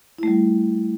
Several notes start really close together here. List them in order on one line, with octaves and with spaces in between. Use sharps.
E4 A3 G3